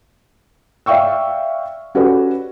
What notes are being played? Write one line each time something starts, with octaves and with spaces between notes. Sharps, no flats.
D5 E5 F5 G5 C#6 E6
C#4 F#4 G4 A4 B4 D5